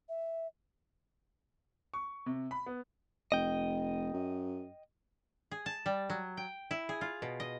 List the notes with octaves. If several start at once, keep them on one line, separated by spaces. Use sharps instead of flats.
E5
C#6
C3
B5
B3
F1 D#5 G5
F#2
G#4
A5
G3
F#3
G5
E4
G#4
F4
B2
D#5